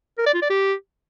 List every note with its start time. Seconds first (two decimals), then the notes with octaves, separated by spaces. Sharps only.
0.18 A#4
0.26 D5
0.34 F4
0.42 D5
0.50 G4